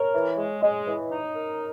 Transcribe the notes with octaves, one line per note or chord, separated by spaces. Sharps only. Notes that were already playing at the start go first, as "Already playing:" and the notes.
Already playing: A#4 C#5
E3
G#3
G#3 D#5
E3
D#4
A#4